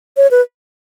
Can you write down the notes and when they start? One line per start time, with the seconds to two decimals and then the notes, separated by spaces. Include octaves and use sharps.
0.17 C#5
0.31 B4